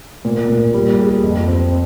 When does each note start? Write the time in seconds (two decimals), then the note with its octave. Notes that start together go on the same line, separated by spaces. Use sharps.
0.25 A#2
0.49 A#2
0.74 G3
0.99 G#4
1.24 F2
1.48 C4